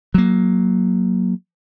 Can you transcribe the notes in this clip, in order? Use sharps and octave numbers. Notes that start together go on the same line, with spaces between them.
F#3 A#3